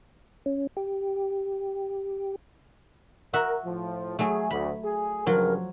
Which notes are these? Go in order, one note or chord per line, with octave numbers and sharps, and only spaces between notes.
C#4
G4
F#4 A#4 E5 F#5
A2 F3
F#3 A3 G#4
D2 B5
G#4
G2 C#3 F3 F#3 A#4